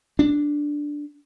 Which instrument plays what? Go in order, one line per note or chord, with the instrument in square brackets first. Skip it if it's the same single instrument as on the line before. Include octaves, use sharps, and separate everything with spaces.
[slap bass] D4